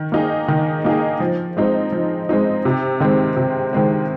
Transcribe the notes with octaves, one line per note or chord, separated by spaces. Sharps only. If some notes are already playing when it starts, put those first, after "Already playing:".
Already playing: D#3
A#3 D#4 G#4
D#3
A#3 D#4 G#4
F3
G#3 C4 D#4
F3
G#3 C4 D#4
C3
D#3 G#3 C4
C3
D#3 G#3 C4